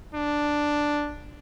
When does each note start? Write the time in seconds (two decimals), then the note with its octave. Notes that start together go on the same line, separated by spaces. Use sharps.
0.15 D4